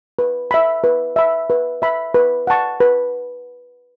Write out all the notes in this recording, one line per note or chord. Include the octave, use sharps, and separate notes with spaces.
B4
E5 B5
B4
E5 B5
B4
E5 B5
B4
F#5 A5 C#6
B4